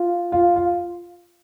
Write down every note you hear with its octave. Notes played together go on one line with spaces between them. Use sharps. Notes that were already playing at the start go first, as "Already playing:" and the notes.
Already playing: F4
F4
F4